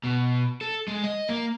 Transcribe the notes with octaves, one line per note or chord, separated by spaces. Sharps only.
B2
A4
G#3
D#5
A#3